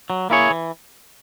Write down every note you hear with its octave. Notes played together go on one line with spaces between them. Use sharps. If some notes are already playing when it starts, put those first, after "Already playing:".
F#3
A#3 E4 G#4 C#5
E3